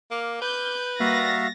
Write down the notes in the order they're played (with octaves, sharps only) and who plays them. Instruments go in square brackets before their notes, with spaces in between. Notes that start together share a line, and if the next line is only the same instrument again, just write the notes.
[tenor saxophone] A#3 [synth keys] D6 F6
[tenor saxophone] B4 [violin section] G6
[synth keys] G3 A#3 [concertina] F#4 E5 F5 [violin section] A6 A#6